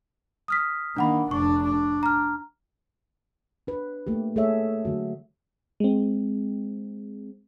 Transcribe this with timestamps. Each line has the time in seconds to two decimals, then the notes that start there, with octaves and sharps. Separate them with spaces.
0.48 D#6 F6 B6
0.97 D#3 A#3 D4 F#5 B5
1.31 F1 D4 C#6
1.65 D4
2.03 A#5 F6
3.67 D4 B4
4.07 A3 A#3 G4
4.36 A3 G#4 A4 C#5 E5
4.85 D3 F#3 F#4
5.80 G#3 C4